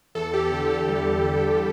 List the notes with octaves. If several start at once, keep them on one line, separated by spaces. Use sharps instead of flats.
E2 A4
G4
D3 G4
A4
G3
E2